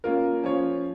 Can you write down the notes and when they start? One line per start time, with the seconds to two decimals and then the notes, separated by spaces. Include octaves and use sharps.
0.04 A#3 C#4 F4 A#4
0.44 F3 C#4 F4 C#5